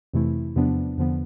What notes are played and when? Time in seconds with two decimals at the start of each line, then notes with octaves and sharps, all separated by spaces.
0.13 F2 C3 E3 A3 E4
0.56 E2 C3 F3 B3 D4
0.98 E2 D3 F3 B3